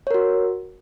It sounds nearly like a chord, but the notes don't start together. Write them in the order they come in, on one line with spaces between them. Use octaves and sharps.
C#5 A#4 F#4